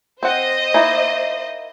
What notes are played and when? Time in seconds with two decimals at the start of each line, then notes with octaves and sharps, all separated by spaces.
0.23 C4 C5 D#5 F#5
0.74 A#3 D#4 E4